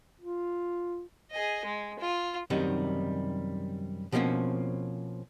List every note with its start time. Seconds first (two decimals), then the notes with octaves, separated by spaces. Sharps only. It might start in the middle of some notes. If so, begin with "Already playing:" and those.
0.21 F4
1.31 G#4 D#5
1.65 G#3
1.99 F4
2.50 F#2 C3 D#3 G3 D#4
4.12 B2 F3 G3 A#3 C4 C#4